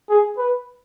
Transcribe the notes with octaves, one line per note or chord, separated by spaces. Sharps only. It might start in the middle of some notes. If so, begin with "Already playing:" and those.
G#4
B4